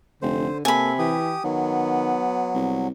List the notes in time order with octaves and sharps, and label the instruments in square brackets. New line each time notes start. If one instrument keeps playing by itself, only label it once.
[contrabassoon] F1 [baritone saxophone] D3 [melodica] C5
[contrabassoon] C3 [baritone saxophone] A#3 [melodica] A4 [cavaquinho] G#5 B5
[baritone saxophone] E3 [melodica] G4 D#6
[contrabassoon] D#3 [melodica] F#3 [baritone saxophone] B3
[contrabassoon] C2